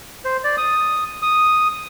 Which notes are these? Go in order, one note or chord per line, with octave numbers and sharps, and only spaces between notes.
C5
D5
D#6
D#6